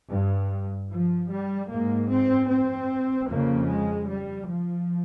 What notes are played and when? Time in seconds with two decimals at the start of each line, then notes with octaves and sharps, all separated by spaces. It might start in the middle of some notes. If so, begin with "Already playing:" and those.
0.12 G2
0.91 F3
1.32 G3
1.70 G#2 A#3
2.10 C4
2.50 C4
3.29 F2 C#3 A#3
3.68 G#3
4.09 G3
4.48 F3